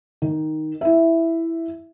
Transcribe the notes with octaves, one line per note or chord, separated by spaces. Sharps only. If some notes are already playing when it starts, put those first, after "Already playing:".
D#3
E4 E5